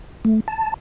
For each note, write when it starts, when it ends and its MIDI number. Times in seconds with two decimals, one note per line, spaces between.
0.25 0.40 57
0.48 0.74 81